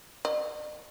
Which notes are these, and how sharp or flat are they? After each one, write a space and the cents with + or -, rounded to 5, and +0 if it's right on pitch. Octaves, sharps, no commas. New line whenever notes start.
D5 +45